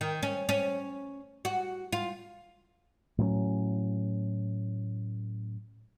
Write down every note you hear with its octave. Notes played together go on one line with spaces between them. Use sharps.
D#3
C#4
C#4
F#4
F4
A2 F#3 C4 C#4